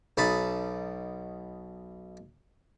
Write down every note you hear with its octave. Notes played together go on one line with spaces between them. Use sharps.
B1 B2 D#4 A5 B5